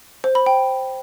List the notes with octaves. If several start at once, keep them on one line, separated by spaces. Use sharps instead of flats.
C5
B5
G5